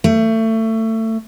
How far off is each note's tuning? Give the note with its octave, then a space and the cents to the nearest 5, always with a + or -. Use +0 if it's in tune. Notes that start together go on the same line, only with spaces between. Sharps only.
A3 +25